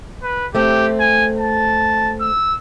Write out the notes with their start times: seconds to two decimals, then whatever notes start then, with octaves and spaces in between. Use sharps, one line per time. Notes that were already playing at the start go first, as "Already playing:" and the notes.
0.23 B4
0.55 A3 C4 G4
1.00 G#5
1.39 A5
2.20 E6